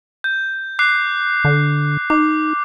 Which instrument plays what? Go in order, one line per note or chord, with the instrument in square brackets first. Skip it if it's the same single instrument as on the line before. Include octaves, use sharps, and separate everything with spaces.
[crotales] G6
D6 F#6 C7
[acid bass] D3
[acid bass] D#4 [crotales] D6